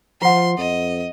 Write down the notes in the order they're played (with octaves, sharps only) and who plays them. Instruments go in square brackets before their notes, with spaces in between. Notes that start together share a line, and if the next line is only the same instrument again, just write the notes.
[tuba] F3 [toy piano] F4 F#5 [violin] C6
[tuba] F2 [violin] D#5